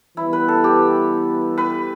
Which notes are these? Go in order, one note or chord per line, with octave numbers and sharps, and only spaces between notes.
E3 G3 B3 E4
B4
A4
G4
B4